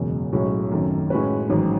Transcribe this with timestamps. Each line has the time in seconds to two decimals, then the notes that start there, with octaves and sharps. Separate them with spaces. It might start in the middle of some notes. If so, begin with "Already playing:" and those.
Already playing: F#1 E2 B2 G#3
0.32 B1 A2 G#3 C#4 F#4
0.72 G#1 F#2 D#3 A3
1.10 A2 G#3 C#4 F#4 B4
1.49 A1 G#2 D#3 F#3